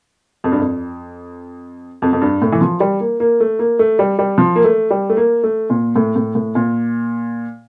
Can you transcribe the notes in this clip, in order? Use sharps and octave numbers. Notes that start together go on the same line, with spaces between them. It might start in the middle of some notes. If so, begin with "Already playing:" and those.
F2
G2
F2
F2
F2
G2
A2
E3
F3
G3
A#3
A#3
A3
A#3
A3
G3
G3
F3
A#3
A3
G3
A3
A#3
A3
A#2
A2
A2
A2
A#2